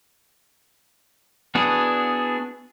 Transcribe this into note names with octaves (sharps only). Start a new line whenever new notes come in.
B3 D4 E4 F#4 G#4